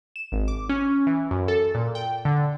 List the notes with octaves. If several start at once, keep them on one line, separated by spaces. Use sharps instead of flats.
E7
G#1
D6
C#4
E3
F#2
A4
A#2
G5
D3